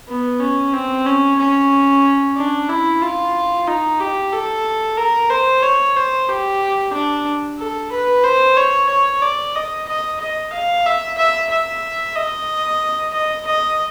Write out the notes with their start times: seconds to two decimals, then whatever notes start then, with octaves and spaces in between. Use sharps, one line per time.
0.08 B3
0.40 C#4
0.73 C4
1.06 C#4
1.39 C#4
2.37 D4
2.70 E4
3.01 F4
3.67 D#4
4.00 G4
4.32 A4
4.97 A#4
5.30 C5
5.63 C#5
5.96 C5
6.29 G4
6.93 D4
7.59 A4
7.92 B4
8.24 C5
8.57 C#5
8.89 C#5
9.22 D5
9.55 D#5
9.88 D#5
10.21 D#5
10.53 F5
10.86 E5
11.18 E5
11.51 E5
12.16 D#5
13.13 D#5
13.47 D#5